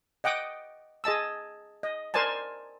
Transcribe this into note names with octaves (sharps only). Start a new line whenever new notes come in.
D#5 F#5 G5 D6 D#6
G#4 D#5 A5 E6
D#5
A#4 C5 D5 G#5 A5